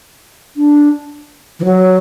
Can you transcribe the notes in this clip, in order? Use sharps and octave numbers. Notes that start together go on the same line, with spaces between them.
D4
E3
F#3